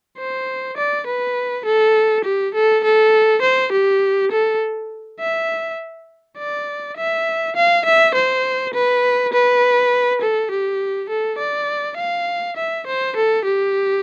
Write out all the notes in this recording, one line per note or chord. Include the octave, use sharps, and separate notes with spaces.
C5
D5
B4
A4
G4
A4
A4
C5
G4
A4
E5
D5
E5
F5
E5
C5
B4
B4
A4
G4
A4
D5
F5
E5
C5
A4
G4